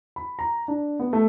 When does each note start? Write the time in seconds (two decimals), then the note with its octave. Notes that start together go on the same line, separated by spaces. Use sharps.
0.16 B5
0.39 A#5
0.68 D4
1.00 B3
1.13 A3